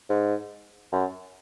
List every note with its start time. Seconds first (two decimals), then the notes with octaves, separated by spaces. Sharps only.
0.10 G#2
0.92 F#2